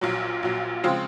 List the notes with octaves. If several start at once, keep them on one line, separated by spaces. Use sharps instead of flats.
A#1 A#2 F#3
A#1 A#2 F#3
C#3 F3 G#3 C4 F4